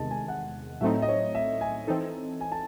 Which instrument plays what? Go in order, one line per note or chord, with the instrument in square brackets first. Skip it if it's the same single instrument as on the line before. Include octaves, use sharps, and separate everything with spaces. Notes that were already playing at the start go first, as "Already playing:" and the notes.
Already playing: [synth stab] E2 C3 D#3 G#3 [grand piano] A5
[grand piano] G#5
F#5
[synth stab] A2 F#3 A3 C4 D#4 [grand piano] E5
[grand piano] D#5
C#5
E5
G#5
[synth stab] E3 C4 D#4 A4
[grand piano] G#5
A5